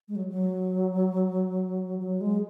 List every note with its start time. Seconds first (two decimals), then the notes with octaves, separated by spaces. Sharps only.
0.08 G#3
0.16 F#3
0.29 F#3
1.99 F#3
2.21 G#3